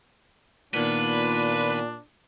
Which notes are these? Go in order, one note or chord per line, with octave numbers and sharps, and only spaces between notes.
A#2 D#3 A#3 B3 D4 B4